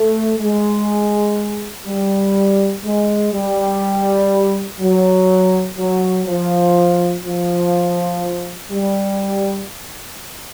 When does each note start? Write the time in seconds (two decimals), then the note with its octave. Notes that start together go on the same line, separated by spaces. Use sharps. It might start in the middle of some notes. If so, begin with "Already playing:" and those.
Already playing: A3
0.39 G#3
1.86 G3
2.84 G#3
3.33 G3
4.80 F#3
5.78 F#3
6.27 F3
7.25 F3
8.71 G3